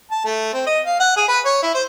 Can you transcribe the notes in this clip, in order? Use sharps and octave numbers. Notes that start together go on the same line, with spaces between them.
A5
A3
C4
D#5
F5
F#5
G#4
B4
C#5
E4
C5